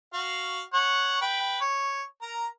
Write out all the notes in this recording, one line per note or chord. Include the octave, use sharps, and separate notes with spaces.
F#4 F5
C#5 F#5
B4 G5
C#5
A#4 A#5